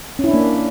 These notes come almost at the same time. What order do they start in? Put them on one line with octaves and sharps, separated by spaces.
C#4 E4 D4 A#3